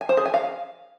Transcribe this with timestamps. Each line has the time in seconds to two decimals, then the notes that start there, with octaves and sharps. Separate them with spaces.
0.01 G#5
0.09 C5
0.17 G#4
0.26 G#5
0.34 F5